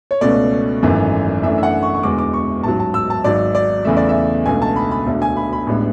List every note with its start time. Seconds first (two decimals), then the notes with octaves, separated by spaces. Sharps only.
0.11 C#5
0.21 C#2 B2 A3 C#4 D5
0.82 G#1 F#2 E3 A3
1.43 F#2 E3 A3 D4 E5
1.58 E5
1.63 F#5
1.83 C#6
1.95 C#6
2.03 E1 E2 D3 G#3 D6
2.19 D6
2.33 C#6
2.63 A1 G#2 F#3 A5
2.80 A5
2.94 E6
3.10 A5
3.24 G#1 G#2 F#3 D5
3.55 D5
3.85 E2 C#3 E3 A3 E5
3.97 D5
4.09 E5
4.46 C#2 B2 A3 D4 G#5
4.62 A5
4.76 B5
4.91 B5
5.06 E1 D2 D3 A3 D4
5.22 G#5
5.37 B5
5.53 B5
5.67 A1 A2 G#3 B3 D4